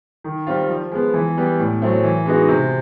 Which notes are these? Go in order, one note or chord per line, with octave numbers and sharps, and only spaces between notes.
D#3
G3 C4 F4
F3
G#3 B3
E3
G3 B3
A2
F#3 A3 C4
E3
G#3 B3 D#4 F#4
C3